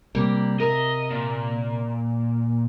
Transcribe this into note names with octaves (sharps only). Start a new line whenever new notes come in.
C3 G3 A#3
A#4 D#5 E5
A#2